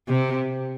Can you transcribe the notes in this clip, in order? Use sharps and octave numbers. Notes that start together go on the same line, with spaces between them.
C3